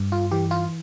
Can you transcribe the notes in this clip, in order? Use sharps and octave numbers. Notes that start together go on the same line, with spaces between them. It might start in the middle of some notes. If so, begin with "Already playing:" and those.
Already playing: G2
F4
E3 G4
F4